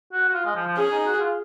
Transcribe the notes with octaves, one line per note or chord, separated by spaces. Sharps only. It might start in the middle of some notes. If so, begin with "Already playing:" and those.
F#4
F#4
F4
G#3
F3
F3
C#4 G#4
D#4
F#4
F4